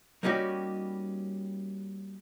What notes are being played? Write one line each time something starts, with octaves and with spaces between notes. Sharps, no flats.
G3 A#3 C#4 D#4 F#4 G4